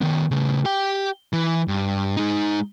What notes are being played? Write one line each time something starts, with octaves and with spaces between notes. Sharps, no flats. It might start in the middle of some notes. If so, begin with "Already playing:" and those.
D#3 B3
C#3 A3
G4 G5
E3
G2
G#3 D#4